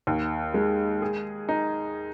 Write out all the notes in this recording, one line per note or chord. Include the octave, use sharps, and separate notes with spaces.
D#2
G#3
G#4
D#4